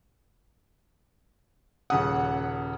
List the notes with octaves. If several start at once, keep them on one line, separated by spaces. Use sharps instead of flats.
D#1 C#3 F#5 D#6